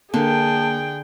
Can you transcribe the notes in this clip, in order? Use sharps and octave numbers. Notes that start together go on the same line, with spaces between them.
D3 A#3 G#4 G5 A5